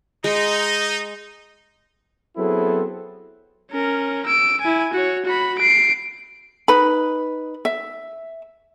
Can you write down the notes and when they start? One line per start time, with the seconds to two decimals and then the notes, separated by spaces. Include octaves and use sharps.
0.24 G#3 D#4
2.37 F#3 B3 C4 E4 G#4 A4
3.71 C#4 A#4
4.26 E6 D7
4.61 E4 G#5
4.93 F#4 C#5
5.25 F#4 B5
5.59 C7 D7
6.68 D#4 B4 B5
7.65 E5